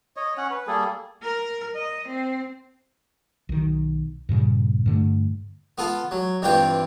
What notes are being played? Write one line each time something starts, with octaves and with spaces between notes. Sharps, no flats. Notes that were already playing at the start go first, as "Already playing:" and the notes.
C#5 D#5
C#4 C#5 F#5
B4
G3 A#3 G#4 A4
A#4
D#5
C4
B1 D#3
G2 A#2 C#3 G3
G2 D3 A3
B3 F4 A4
F#3
G2 E3 C4 F4 G4 G5